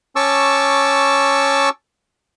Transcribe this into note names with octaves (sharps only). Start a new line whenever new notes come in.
C#4 A5 C#6 D6 E6